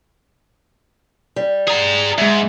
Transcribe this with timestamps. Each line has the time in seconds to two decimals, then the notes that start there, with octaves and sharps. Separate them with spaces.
1.36 G3
1.67 G#4 A#5
2.18 G#2 G#3 E5